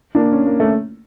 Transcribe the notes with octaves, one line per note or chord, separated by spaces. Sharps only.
A#3 D4
C#4
A#3
A3 C#4